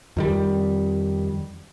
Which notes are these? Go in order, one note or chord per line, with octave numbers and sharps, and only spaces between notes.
F2 D#3 G3